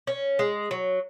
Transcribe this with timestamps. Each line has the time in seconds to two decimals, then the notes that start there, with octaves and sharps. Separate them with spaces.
0.07 C#4
0.39 G#3
0.71 F#3